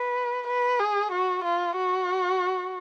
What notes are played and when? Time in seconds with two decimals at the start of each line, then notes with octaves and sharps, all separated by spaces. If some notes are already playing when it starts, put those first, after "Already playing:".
Already playing: B4
0.47 B4
0.79 G#4
1.12 F#4
1.44 F4
1.76 F#4